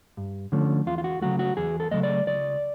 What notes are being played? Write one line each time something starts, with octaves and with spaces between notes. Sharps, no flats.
G2
D3 F3 A3 C#4
E2 F4
F4
F#4
C#3 F#3 A3 F#4
F#4
E2 G#4
A4
C#3 F#3 A3 D#5
D5
C#2 D5